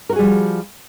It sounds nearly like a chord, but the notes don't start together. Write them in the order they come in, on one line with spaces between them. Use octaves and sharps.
A#4 F#4 G#4 G3 F3